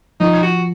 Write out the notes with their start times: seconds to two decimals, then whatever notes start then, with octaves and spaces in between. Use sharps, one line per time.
0.20 F3 D#4
0.42 F#4